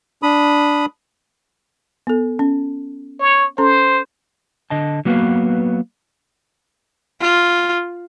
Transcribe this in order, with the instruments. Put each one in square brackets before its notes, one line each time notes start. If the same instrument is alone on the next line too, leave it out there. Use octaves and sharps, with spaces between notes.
[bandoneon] D4 B5 D#6
[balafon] B3 A4
C#4
[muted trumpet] C#5
[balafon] C#4 A4 A#5 [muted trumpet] C5
[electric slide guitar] D3 D#5 A5
F#3 A#3 B3 F#4 B4 F5
[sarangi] F4